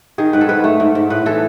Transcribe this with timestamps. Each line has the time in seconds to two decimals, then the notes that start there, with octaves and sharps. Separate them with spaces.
0.18 D#3 G#4
0.33 G#2 B4
0.41 A4
0.49 G#2 B4
0.64 A3
0.80 G#2
0.95 G#2
1.10 A2 B4
1.26 E3 A4